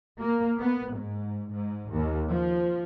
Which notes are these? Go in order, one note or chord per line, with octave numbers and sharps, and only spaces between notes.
A#3
B3
G#2
G#2
D#2
F3